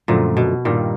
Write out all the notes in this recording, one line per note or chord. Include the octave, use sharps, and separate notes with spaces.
F#2 A#2 D3 F3 A3
B2
G2 A#2 D#3 G3 A#3 D#4